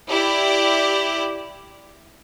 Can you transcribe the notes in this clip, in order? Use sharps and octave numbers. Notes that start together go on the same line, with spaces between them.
E4 G4 D5